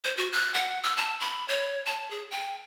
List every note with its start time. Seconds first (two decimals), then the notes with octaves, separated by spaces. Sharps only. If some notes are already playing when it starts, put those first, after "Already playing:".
0.04 C5
0.17 F#4
0.32 F#6
0.54 F#5
0.83 E6
0.97 A5
1.20 B5
1.48 C#5
1.86 A5
2.11 G#4
2.31 G5